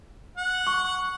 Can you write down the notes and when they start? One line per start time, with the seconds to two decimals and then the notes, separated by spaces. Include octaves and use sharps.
0.38 F#5
0.67 C#6